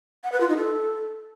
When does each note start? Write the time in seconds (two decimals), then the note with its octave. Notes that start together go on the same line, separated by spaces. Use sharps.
0.24 F#5
0.32 B4
0.40 F4
0.49 D#4
0.57 A4